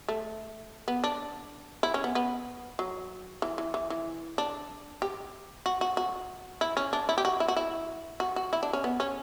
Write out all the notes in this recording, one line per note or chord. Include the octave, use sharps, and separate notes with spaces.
A3
B3
D4
E4
C#4
B3
B3
F#3
E3
E3
E3
E3
D4
G4
F#4
F#4
F#4
E4
C#4
D4
E4
G4
F#4
E4
F#4
E4
F#4
F#4
E4
D4
C#4
B3
C#4